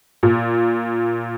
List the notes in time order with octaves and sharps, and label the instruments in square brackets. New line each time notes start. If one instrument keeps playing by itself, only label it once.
[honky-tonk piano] A#2